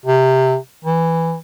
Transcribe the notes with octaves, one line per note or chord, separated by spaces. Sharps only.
C3
E3